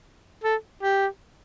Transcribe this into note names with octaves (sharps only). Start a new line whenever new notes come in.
A4
G4